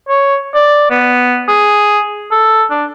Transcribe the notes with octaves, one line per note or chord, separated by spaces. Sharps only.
C#5
D5
B3
G#4
A4
D4